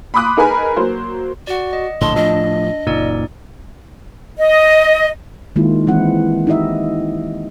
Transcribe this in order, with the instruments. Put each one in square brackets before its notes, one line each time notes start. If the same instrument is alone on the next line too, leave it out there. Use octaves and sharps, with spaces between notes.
[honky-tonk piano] B5 C6 D6 D#6 F#6
D#4 G#4 A#4 B4 G#5 B5
F#3 A#3 C5
[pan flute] F#4 [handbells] D5 F#5
[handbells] D#5
[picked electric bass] A#1 A2 D3 [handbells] D#5 A5 [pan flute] C6
[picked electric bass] A2 F3 [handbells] D4 [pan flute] D#5
[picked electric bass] F#1 A#2 [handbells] D#4 D5
[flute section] D#5
[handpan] D#3 G#3 A#3 E4 F4
E3 G#3 C4 E4 F#5
D#4 E4 G4 D#5 E5